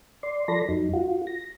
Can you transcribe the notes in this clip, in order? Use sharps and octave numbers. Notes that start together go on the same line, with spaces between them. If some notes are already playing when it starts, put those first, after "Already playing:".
D5 C6
F3 A4 D5 B5 C6 A#6
F2 F#3 D#4
F4 F#4
A#6